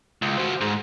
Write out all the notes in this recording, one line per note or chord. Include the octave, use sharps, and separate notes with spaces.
C#2
F#4 C5
G#2